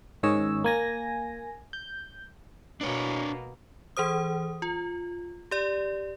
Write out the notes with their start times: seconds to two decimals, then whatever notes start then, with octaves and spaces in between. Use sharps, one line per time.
0.23 G#2 D#3 C#4 C#5 D#5 E6
0.64 A#3 G#5 A#6
1.73 G6
2.81 B2 A#3 B3 D4 C#5
3.97 E3 G#4 C5 D#6
4.62 F4
5.51 G4 D5